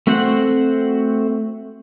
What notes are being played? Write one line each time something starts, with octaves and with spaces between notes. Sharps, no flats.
A3 C4 F#4 C5 F#5